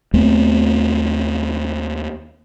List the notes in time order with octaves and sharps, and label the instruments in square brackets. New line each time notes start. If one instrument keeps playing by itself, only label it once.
[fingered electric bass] D#2 A3 B3 C4